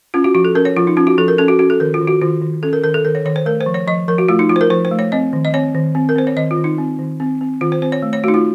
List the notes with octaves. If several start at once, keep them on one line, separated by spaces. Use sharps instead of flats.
C#4 F4
F#4
F3 F#4
A4
C#4 A#4
C#5
F3 F4
D#4
C#4 F4
F#4
F3 A4
A#4
C#4 A4
F#4
C#4 F#4
A4
D#3 A#4
F4
D#3
F#4
D#3 F4
D#3
C#4 A4
A#4
D#3 A#4
A4
D#3 A#4
C#5
D#3 C#5
C5
A3 A#4
C5
F3
C#5
F3 D#5
F3 A#4
F#4
A3 F4
D#4
F3 F4
C5
A#4
F3 C5
C5
A3
C#5
C4 D#5
D#3
D#5
C4 C#5
D#3
C4
A#4
C4 C5
C#5
D#3 D#5
F4
D#3
D#4
C4
D#3
C4
C4
D#3 F4
C5
C4 C5
C#5
A3
C#5
A3 D#4 F#4
F4